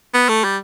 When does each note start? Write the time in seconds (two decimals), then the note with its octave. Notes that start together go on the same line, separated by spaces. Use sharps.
0.14 B3
0.29 A3
0.44 G3